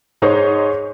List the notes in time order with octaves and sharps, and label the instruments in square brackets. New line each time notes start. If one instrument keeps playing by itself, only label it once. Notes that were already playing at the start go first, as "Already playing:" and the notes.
[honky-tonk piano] G#2 D#4 C5 C#5 C#6